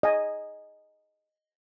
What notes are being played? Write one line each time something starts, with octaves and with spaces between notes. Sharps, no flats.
D#5 G#5